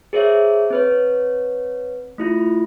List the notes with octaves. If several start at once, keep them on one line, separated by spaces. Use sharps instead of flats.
G#4 A#4 C5 C#5 E5
C4 B4 C#5
A3 E4 F4